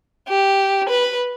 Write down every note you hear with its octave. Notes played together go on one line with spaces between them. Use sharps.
G4
B4